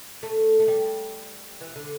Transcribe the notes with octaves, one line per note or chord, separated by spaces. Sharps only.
A3
A3
G3
E3
D3